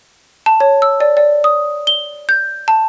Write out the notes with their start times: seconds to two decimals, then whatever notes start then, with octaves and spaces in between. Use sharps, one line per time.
0.46 A5
0.60 C#5
0.82 E6
1.00 D5
1.17 D5
1.44 D#6
1.87 G7
2.29 G6
2.68 A5